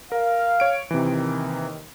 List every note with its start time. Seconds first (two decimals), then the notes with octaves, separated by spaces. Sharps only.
0.12 A#4 F5
0.60 C#5 D7
0.91 D#2 C3 D#3 E3